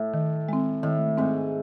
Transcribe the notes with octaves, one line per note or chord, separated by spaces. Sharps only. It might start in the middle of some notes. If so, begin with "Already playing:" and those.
Already playing: A2
D#3
G#3 C4
A2 D#3
G#2 G#3 C4